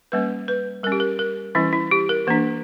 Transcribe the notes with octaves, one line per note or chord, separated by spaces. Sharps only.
G3 A#3 C#4 B4
B4
G3 C#4 A#4
G4
A#4
A#4
E3 G3 C#4 E4
E4
G4
A#4
E3 A#3 D4